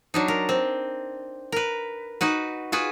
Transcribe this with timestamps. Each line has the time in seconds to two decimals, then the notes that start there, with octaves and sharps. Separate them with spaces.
0.14 F#3 D4 D#4
0.28 A#4
0.49 C4
1.52 A#4 B4
2.21 D#4 F#4 B4
2.72 F4 F#4 G#4 B4